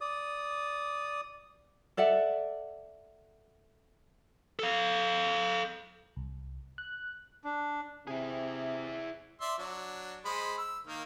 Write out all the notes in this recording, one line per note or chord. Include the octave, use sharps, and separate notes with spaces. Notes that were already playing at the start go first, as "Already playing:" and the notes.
D5 D#6
A4 D5 E5 F#5
A4 F5
C2
F#6
D4
C3 E4 G#4
D5 E5 C6
F#3 D4
G#3 C5 B5
E6
D#3 A#3